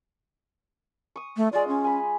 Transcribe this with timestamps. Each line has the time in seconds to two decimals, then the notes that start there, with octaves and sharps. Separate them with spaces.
1.16 C#6 D#6
1.37 A3
1.53 G#3 F4 D5
1.68 C#4
1.84 G#5 B5